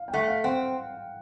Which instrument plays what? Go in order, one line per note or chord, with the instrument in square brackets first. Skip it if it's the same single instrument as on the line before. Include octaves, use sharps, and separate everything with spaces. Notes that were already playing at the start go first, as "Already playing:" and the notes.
Already playing: [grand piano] F5
G5
[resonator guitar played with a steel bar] A3 [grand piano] F#5
[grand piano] F5
[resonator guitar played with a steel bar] C4 [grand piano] F#5